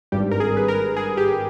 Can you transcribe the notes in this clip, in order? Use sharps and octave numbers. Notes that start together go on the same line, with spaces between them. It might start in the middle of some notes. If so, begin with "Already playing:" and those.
G#1 G2 G3 G4
A#4
G#4
B4
A#4
G#4
G4